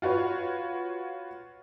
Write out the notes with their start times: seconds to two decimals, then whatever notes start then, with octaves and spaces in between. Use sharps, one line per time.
0.02 F4 F#4 B4 C#5